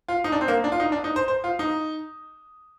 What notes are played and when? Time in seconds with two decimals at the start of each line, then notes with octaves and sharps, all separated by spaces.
0.08 F4
0.24 D#4
0.32 D4
0.41 C4
0.48 A#3
0.64 D4
0.72 F4
0.80 D#4
0.92 D4
1.04 D#4
1.16 C5
1.28 C5
1.44 F4
1.59 D#4